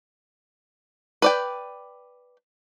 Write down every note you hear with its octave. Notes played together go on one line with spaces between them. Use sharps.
B4 D5 G5